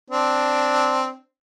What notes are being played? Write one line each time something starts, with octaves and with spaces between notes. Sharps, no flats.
C4 D4